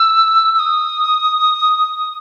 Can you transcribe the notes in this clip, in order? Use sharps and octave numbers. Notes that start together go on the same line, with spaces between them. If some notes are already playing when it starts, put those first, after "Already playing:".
Already playing: E6
E6
D#6